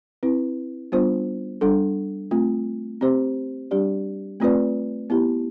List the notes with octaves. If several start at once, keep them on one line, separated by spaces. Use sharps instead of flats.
C4 E4 B4
G3 B3 D4 F4 C5
G3 D4 A4
A3 C4 F4
C4 G4 C5
G3 D4 G4 D5
A3 C4 F4 B4 D5
B3 E4 G4